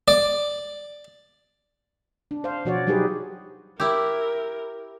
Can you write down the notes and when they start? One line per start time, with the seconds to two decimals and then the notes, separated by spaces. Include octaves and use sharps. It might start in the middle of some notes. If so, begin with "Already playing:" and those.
0.08 D5
2.31 D4
2.44 C5 F5
2.65 B2 F3 F#4 C#5 D5
2.87 F#3 G3 D#4 G4 G#4 B4
3.80 E4 G4 A#4